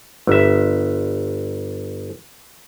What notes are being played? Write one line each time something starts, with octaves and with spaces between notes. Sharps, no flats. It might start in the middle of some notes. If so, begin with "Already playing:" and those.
G1 E5